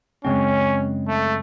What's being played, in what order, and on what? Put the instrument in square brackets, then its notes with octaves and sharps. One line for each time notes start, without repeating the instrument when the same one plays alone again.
[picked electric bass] F#2 C#3 G#3 C4 [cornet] C#4
[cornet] A3